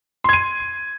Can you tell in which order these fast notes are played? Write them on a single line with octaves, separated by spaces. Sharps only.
C6 G#6 D#7